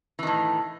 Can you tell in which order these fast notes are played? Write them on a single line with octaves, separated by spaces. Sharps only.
E3 D#3 A2